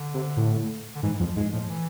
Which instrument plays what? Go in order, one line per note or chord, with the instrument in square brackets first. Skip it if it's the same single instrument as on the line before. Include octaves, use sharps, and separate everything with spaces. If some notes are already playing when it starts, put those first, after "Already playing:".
Already playing: [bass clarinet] D3
[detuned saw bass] C3
A2
[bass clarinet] D3
[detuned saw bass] G#2 [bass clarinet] E3
[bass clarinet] E3
[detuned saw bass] F2 [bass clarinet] F3
[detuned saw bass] G#2 [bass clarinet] G#3
[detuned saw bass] A2 [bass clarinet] F3
[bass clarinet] E3